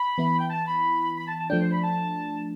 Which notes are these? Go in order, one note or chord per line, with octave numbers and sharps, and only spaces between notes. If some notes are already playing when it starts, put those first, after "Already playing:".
Already playing: B5
E3 B3 E4
G5
A5
B5
B5
A5
A5
F3 A3 D4 G5
C5
B5
A5